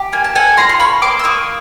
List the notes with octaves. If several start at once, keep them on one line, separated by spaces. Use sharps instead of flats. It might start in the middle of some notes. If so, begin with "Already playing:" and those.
Already playing: G4
A#3 G#5
A5
A4 F#5 G#5
F4 A#5 C6
C6
C#4 B5 C#6
A#3 C6 D6
E6
A#3 C#6 D#6